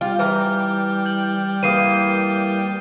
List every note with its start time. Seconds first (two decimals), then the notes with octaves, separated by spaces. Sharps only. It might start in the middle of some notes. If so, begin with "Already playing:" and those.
0.01 G3 F4
0.19 E3 G#5 A#5 F6
1.06 G6 F#7
1.63 E3 A#3 D#6 C7 D#7